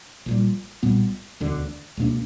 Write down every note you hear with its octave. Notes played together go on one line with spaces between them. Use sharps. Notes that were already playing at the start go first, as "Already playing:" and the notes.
A#1 A#2 G3
B1 A#2 G3 B3
E1 D2 D3
C#2 B2 A#3 D4